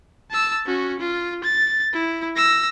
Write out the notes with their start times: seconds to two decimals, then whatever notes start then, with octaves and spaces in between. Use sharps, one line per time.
0.31 A5 E6
0.66 C#4 F#4
1.00 F4
1.44 A6
1.93 E4
2.36 E6 A#6